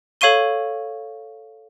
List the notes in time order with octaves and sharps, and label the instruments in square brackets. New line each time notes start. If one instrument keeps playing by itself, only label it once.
[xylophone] A4 C#5 F5 C#6 D#7 G7